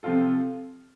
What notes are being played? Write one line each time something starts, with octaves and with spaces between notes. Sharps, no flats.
C3 F3 C4 F4 A4